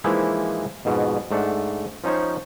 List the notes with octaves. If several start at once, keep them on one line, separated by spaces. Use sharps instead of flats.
E3 F3 G#3 A#3 D#4 E4
F2 G#2 B2
G#2 A3 D4 F#5 A5
F3 C#4 D#4 C5 C#5